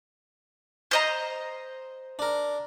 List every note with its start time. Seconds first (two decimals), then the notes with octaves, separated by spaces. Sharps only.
0.91 C5 D#5 A#5
2.19 D4 A#4